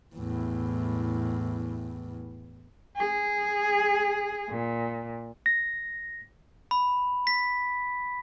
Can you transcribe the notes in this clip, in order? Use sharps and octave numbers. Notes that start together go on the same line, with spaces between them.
E2 A2
G#4
A#2
A#6
B5
B6